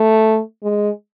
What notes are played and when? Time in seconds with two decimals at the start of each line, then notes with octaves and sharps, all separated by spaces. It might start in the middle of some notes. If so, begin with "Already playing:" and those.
Already playing: A3
0.63 G#3